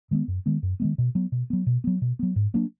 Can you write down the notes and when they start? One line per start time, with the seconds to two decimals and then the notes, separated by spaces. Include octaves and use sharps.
0.11 D#3 G#3 B3
0.28 F#2
0.46 D#3 G#3 B3
0.63 F#2
0.80 D#3 G#3 B3
0.98 B2
1.15 F#3 B3
1.32 B2
1.50 F#3 B3
1.67 B2
1.84 F#3 B3
2.02 B2
2.19 F#3 B3
2.36 G#2
2.54 F#3 A#3 D4